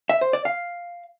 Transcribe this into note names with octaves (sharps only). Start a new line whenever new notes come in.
E5
C5
D5
F5